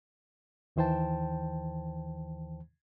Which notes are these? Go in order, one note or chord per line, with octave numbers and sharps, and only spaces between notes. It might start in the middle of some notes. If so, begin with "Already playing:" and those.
D#2 D#3 E3 C5 G5 A5